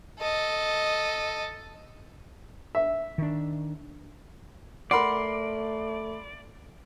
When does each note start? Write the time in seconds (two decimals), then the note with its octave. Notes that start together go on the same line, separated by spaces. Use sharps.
0.19 A4 D#5
2.75 E5
3.18 D#3 D4
4.91 A3 A#4 D5 F#5 B5 C6 C7